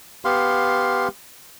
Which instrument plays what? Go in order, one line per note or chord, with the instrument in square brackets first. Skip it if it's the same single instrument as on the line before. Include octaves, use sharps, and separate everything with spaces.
[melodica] B3 G4 F5 C6